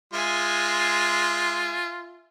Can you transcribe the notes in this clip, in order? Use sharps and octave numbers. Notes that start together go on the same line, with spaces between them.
G#3 F4 E5 G#5 C6